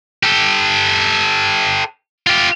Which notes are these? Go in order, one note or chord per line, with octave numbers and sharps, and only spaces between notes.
G4 A4
F4 G4